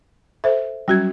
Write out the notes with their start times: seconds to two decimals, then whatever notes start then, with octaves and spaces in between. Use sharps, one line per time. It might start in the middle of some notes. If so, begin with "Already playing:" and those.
0.44 A4 C5 E5
0.88 F#3 G3 C#4 F#4 G#6